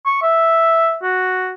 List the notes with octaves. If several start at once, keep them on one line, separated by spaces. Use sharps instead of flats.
C#6
E5
F#4